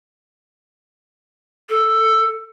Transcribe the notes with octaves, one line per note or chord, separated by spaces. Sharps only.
A4